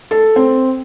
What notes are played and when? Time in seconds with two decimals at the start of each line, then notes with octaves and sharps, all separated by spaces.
0.11 A4
0.36 C4